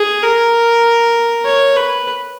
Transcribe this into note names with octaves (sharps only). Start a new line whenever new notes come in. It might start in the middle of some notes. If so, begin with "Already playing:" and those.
Already playing: G#4
A#4
C#5
B4